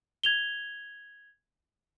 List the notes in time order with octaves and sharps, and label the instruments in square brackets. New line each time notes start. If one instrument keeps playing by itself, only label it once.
[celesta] G#6 F7 G7